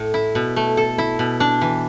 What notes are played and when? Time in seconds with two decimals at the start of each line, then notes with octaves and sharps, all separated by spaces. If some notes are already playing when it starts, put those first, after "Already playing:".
Already playing: A2
0.14 E4
0.35 B2
0.56 A3
0.77 A4
0.98 E4
1.19 B2
1.40 D4
1.61 E3